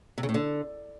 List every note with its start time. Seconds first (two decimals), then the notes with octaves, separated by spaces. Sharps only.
0.18 C3
0.23 C#3
0.29 A2
0.34 D3